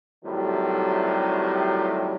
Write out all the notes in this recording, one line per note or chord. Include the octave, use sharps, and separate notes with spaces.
A2 C3 D#3 F#3 G3